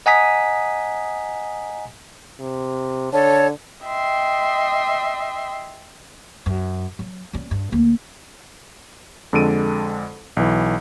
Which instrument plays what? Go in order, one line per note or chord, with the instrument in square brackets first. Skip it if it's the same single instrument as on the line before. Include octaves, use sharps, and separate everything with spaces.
[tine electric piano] D#5 F#5 G#5 A#5 D#6 B6
[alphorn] C3
[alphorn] D3 [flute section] A4 C#5 A5
[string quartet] D#5 E5 G5 C6
[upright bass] F#2
F#3
G3 C#4
G2
D2 A#3
[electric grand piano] F2 D3 G#3 A4 D7 D#7
B1 E3